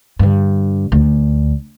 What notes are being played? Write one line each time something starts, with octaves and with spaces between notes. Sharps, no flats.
G2 D3
D2